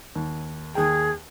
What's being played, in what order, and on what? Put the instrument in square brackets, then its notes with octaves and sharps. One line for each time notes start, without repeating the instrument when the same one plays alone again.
[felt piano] D#2
[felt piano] D#2 G5 [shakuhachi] G#4